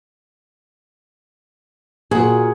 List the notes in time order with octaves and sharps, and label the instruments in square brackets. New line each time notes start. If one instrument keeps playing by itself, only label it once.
[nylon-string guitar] A#2 F#4 [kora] G#4